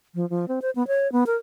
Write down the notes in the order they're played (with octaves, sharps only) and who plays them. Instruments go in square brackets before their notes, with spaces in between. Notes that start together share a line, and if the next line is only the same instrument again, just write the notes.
[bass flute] F3
F3
C4
C5
B3
C#5
B3
A#4